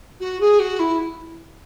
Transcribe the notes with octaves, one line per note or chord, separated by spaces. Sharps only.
F#4
G#4
F#4
E4